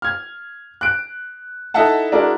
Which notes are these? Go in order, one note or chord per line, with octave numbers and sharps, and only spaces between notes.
F6 G#6
F#6 D7
D#4 E4 A4 E5 F#5 A5
G#3 D4 E4 F#4 A#4